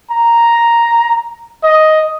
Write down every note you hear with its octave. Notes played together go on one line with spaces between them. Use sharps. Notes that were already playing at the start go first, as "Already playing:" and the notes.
A#5
D#5